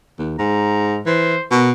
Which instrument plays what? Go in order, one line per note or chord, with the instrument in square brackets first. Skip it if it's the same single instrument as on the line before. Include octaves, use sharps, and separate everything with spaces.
[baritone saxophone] D#2
[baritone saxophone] G#2 [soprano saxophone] A#5
[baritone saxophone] E3 [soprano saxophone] C5
[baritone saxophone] B2 [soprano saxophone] A#4